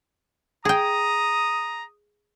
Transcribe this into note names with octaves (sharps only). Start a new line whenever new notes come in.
G#4 G5 A#5 D#6